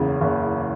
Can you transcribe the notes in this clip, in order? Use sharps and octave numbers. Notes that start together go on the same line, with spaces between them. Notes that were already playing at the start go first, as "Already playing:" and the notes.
Already playing: F#1 E2 C#3
F#1